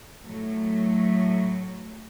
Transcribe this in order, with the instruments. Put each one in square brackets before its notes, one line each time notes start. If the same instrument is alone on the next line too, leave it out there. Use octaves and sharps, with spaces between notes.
[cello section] A2 F#3 A3